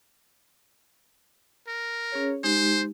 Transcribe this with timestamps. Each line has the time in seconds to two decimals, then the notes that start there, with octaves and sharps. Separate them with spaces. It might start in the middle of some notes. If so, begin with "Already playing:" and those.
1.68 A#4
2.12 C#4 G#4 C#5
2.44 G#3 D#4 G4 C5